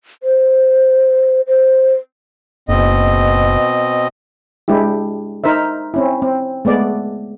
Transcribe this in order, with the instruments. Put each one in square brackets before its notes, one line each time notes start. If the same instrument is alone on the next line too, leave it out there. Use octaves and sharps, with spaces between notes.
[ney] C5
C5
[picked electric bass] F#1 [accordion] B2 C4 D#5
[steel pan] G#3 D4 E4 G4
D#4 A#4 C5 E5
C4 C#4 E4
C4
G#3 A3 B3 D5